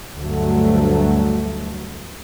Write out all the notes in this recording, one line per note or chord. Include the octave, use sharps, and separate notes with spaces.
D2 G2 F#3 A3